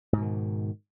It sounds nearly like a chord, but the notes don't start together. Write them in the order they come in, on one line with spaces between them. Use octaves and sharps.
G#2 B2 D#3